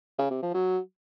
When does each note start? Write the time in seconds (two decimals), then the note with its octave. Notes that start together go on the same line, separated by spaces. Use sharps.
0.19 C#3
0.30 C3
0.42 F3
0.54 F#3